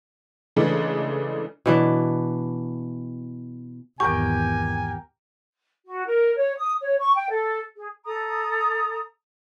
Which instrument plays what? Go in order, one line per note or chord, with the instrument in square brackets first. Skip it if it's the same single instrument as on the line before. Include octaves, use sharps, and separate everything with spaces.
[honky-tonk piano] C#3 E3 G#3 A3 D4
[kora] B2 E3 D4
[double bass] G#1 E2 [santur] G4 A#4 G5 [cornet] G#5 [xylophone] C#6
[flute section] F#4
A#4
C#5
D#6
C#5
C#6
G5
A4
G#4
A4 A#5 D#6